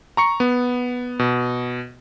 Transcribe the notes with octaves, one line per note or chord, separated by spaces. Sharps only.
A#5 C#6 C#7
B3
B2